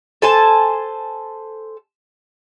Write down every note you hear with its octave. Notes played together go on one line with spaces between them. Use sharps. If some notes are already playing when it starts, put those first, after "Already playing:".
A4 C5 G#5 A5